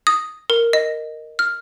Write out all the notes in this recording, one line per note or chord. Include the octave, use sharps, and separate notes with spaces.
D#6
A#4
D#5
F6